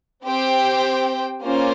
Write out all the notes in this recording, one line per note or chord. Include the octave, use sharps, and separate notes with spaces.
C4 G4 C5 G5
A#3 C#4 F4 C5